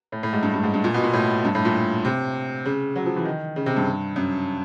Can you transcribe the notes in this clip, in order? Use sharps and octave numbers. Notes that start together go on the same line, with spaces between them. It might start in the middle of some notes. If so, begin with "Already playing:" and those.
A2
A2
G#2
G2
G2
G#2
G2
A#2
B2
A#2
A2
G2
A2
A#2
C3
C#3
F#3
F3
E3
D#3
C#3
C3
G2
F#2